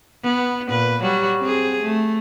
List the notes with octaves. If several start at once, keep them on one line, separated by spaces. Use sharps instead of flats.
B3
A#2 B4
F#3 G3 F#4
C4 G#4
A3